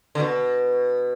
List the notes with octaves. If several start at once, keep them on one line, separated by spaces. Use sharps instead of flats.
D3
B2